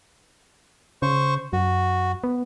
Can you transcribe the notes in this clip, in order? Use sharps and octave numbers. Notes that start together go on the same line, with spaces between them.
C#3 C5 C#6
F#2 F#4
B3